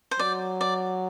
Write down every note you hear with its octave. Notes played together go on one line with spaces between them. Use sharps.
C5
F#3 D5
D5